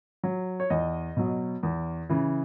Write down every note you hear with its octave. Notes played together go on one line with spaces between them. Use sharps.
F#3
C#5
E2 D#5
B2 F#3
E2
C#3 E3